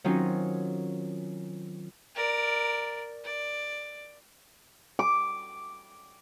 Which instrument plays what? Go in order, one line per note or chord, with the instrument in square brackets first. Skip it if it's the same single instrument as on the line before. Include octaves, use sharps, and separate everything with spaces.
[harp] D#3 F#3 C4 C#4 D#4 F4
[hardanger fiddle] A#4 D5
D5
[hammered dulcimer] D6